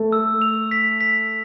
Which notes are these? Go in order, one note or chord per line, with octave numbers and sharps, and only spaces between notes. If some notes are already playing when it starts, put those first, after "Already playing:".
Already playing: A3 A4
E6
F7
B6
B6